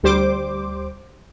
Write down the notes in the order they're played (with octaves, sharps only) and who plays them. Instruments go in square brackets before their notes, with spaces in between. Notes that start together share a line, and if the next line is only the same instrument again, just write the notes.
[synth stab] D2 G3 C5 D6